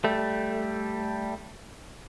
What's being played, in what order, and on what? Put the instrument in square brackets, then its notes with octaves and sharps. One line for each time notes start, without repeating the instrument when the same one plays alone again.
[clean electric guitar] G3 A3